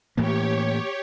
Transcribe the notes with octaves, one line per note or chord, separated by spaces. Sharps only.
A2 E3 A#3 G4 C#5